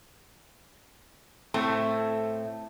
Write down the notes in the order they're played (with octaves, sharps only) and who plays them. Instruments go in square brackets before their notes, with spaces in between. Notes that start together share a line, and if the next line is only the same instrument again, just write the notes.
[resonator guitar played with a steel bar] A2 A3 C4